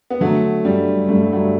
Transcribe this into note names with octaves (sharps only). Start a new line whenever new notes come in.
B3
D3 F#3 A3
G2 G3
G2 A3
G3
F#3 A3